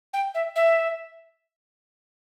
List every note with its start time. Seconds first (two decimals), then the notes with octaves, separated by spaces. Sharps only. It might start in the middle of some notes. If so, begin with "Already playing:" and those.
0.13 G5
0.35 E5
0.56 E5